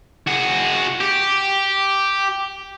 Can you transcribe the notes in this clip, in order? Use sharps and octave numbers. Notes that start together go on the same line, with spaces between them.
F#4 G#4
G4